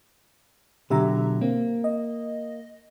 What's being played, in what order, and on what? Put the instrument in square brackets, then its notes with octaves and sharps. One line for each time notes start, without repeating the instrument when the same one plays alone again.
[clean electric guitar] B2 D3 F#3 [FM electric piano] G4 E5 A#5
[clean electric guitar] A#3 [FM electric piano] C4
[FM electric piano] D#5